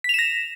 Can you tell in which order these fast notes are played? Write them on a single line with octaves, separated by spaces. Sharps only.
B6 F7 E7 A#6